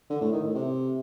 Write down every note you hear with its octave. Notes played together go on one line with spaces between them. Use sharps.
D3
A2
D#3
A2
C3